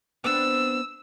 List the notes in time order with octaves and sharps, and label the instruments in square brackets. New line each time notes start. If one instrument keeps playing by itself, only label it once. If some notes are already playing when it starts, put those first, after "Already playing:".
[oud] B3 C4 D4 [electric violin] E6